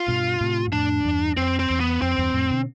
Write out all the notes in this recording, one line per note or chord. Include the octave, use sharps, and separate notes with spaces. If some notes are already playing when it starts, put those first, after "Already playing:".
Already playing: F4
G2 B2
A2 C3
G2
F2 A2 D4
E2 G2
F2 C4
C4
E2
B3
F2 C4
E2 G2
F2 A2
B2 D3